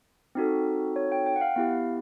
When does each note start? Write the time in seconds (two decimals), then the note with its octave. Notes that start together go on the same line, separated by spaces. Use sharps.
0.35 C4 D#4 F#4 A4
0.96 C#5
1.12 G5
1.26 G5
1.36 F#5
1.41 F5
1.56 B3 E4 G4 F5